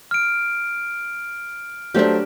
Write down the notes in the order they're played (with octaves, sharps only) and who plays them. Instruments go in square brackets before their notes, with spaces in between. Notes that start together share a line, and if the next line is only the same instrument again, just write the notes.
[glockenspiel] F6 D7
[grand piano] F#3 A3 C5 [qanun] D4 G4